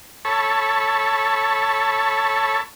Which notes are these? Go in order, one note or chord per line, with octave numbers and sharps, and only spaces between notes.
A4 C#5 A5 B5 C#6